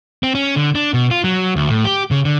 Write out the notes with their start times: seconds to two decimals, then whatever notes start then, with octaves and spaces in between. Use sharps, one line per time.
0.23 C4
0.35 C#4
0.56 D3
0.75 D4
0.93 B2
1.11 F4
1.24 F#3
1.56 D2
1.69 A2
1.85 G4
2.11 C#3
2.25 D3